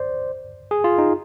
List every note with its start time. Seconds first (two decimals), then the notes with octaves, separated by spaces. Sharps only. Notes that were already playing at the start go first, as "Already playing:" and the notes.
Already playing: C5 D5
0.71 G#4
0.84 F4
0.98 D#4